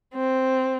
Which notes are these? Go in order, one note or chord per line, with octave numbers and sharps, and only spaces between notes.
C4